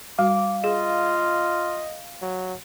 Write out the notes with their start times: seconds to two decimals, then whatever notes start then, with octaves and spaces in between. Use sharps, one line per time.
0.19 G3 F#4 F5 D6
0.64 F4 G#4 D#5
2.22 F#3